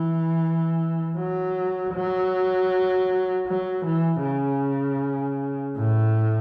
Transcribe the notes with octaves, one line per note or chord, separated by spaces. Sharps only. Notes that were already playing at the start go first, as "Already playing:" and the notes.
Already playing: E3
F#3
F#3
F#3
E3
C#3
A2